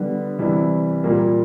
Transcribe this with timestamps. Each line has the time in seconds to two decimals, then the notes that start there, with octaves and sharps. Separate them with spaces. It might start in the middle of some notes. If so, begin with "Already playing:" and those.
Already playing: D3 G3 B3
0.39 C3 E3 G3
1.04 A#2 G3 A#3